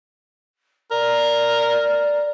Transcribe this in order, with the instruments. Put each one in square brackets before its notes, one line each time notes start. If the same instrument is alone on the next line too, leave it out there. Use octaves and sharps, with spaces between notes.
[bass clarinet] A#4 [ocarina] D5